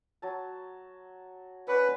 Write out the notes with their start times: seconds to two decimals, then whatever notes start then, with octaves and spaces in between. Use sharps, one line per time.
0.22 F#3 A5
1.68 C#4 B4 D5 F#5